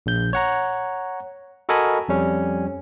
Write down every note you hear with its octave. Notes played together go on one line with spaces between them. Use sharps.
A#1 G6
C#5 F#5 A#5
F#4 A4 A#4 D#5 G#5 B5
F2 G3 C#4